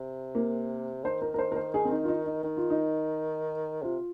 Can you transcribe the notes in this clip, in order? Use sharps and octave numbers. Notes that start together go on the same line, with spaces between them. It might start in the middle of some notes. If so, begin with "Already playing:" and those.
Already playing: C3
A#3
D#3 C5
A#4
A#4
C5
A#4
C5
G#4
C4
D#4
F4
D#4
D#4
D#3 D#4
F4
D#4
C3 F4